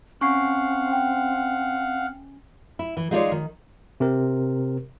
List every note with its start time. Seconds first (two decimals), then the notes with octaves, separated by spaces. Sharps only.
0.21 C4 C#4 F5 F#5 G#5 C#6 C7
0.92 G5
2.79 E4
2.97 E3
3.11 G#3 D#4 F4 F#4 C#5 D5
3.32 D#3
4.00 C3 C4 A#4